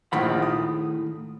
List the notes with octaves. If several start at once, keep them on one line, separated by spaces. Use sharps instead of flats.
A#1 A2 D#3 F4 F#5 B5
D#6